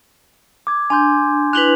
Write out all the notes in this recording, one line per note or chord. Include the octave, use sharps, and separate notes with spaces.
D6 G#6
D4 G#5 C6 G6
D4 E4 B4 F#6 F7 F#7